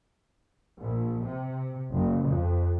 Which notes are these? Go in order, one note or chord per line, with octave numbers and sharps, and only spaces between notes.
A#1
C3
F#1
F2